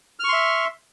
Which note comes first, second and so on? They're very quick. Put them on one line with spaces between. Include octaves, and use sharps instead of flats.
F6 C#6 C6 E5